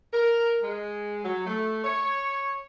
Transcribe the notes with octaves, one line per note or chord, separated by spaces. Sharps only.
A#4
G#3
F#3
A3
C#5